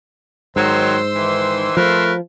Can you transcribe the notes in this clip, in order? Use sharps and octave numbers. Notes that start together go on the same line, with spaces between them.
G#2 D#3 F#3 C5 C6 E6
D#3 E3
F3 A3 A#4 B4